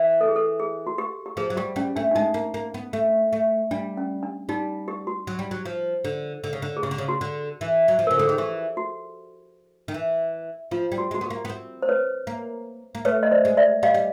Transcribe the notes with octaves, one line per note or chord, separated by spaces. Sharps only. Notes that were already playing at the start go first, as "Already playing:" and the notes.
Already playing: E3
A4
G#4
A4
G#4
F#4
G4
G4
F3 G#4
F#3
G3 G4
G3 C#4
A3 D4
D4
G#3 D#4
A#3
A#3
B3
A3
A3
G3 D4
C#4
D4
G3 D#4
G4
F#4
F#3
G3
F#3
F3
D3
D3
C#3
D3
G#4
C#3 G4
D3
C#3
F#4
D3
E3
F#3
F3
C#3 A#4
D3 A4
D#3 G#4
E3 G4
F#4
D#3
E3
F3 F4
G3
F#4
G#3 F#4
B3 G4
A#3
B3
C4
C5
B4 C#5
A#3
A#3
A3 B4 C#5
D#5
C5 D5
G#3
D5 E5
G3 D#5 F5
G3